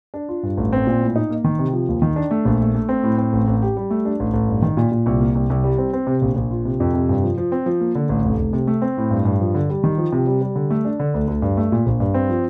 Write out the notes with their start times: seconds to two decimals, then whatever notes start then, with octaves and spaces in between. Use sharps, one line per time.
0.14 D4
0.29 F4
0.43 G2
0.58 A1
0.73 C4
0.87 A#2
1.01 A2
1.16 D#4
1.30 A#3
1.44 D#3
1.59 C3
1.73 F3
1.89 D#2
2.02 D#3
2.16 D4
2.31 A3
2.45 A#1
2.61 A3
2.75 A3
2.89 C4
3.03 A2
3.18 C4
3.33 A1
3.48 A1
3.62 G4
3.77 G3
3.91 A3
4.05 D4
4.20 A1
4.34 A1
4.48 G2
4.62 D#3
4.77 A#2
4.92 A#2
5.06 C2
5.21 A#3
5.35 C2
5.50 C2
5.64 G3
5.78 C4
5.93 C4
6.07 C3
6.22 A#1
6.36 A#1
6.51 F4
6.65 C3
6.80 F2
6.94 C3
7.09 G2
7.23 F3
7.37 F3
7.52 C4
7.66 F3
7.81 A#3
7.95 D3
8.09 A1
8.24 F1
8.39 F1
8.53 C3
8.67 A3
8.82 C4
8.97 A2
9.11 G2
9.25 G2
9.40 F3
9.55 D3
9.69 G3
9.84 D#3
9.98 F3
10.12 C3
10.27 G3
10.41 G3
10.56 D3
10.70 A3
10.85 D4
11.00 D3
11.14 D2
11.28 D2
11.42 G2
11.57 A3
11.72 A#2
11.86 A#1
12.00 G2
12.14 C4
12.29 F3